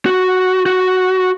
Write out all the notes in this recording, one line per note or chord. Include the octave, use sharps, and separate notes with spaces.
F#4
F#4